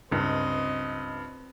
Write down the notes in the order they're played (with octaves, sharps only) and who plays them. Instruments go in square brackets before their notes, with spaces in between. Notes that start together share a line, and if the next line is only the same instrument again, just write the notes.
[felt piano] C#2 G2 [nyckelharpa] C4 D#5